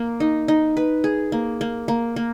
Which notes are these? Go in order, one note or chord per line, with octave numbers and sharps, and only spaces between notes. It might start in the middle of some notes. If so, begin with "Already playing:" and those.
Already playing: A#3
D#4
D#4
B4
G#4
A#3
A#3
A#3
A#3